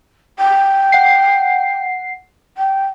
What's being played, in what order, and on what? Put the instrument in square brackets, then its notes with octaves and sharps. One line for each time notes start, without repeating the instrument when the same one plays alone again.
[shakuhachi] G5
[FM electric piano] F#5 C7
[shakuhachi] G5